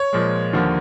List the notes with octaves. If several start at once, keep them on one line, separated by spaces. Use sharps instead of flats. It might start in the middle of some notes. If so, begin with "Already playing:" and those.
Already playing: C#5
A#2 F3 G#3
D#2 D3 F3 A#3